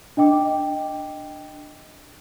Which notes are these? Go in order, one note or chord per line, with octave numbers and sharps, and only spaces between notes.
D4 D#5 G5 D6